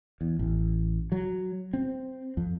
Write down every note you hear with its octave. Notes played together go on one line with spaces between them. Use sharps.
E2
A1
F#3
C4
F2